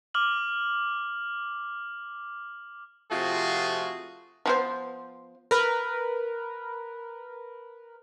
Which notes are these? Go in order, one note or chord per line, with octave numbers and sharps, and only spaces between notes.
D6 F6 F#7
C3 F3 A3 F4 F#4 G#4
F3 B3 C5
A#4 B4